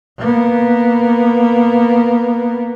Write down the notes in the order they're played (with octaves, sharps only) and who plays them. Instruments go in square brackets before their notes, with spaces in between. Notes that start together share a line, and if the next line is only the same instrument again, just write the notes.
[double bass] A#3 B3